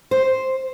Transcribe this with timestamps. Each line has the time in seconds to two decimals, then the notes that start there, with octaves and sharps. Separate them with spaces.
0.11 C5